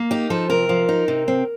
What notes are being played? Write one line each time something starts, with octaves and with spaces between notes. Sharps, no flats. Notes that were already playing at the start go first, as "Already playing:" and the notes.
Already playing: A#3
D#4 G4
F3 A4
C3 A#4
F3
D#4
C3
C4